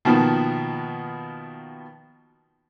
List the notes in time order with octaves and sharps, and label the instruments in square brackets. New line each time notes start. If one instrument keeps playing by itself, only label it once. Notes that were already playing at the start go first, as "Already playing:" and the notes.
[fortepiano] B2 D#3 F3 A#3 B3